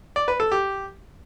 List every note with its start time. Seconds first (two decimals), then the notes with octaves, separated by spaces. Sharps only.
0.16 D5
0.28 B4
0.40 A4
0.52 G4